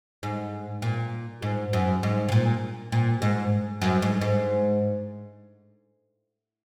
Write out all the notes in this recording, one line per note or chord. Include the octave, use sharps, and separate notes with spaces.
G#2
A#2
G#2
F#2
G#2
C#3
A#2
A#2
G#2
F#2
G#2
G#2